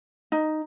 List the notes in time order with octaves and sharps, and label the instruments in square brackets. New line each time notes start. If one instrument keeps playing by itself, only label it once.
[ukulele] D#4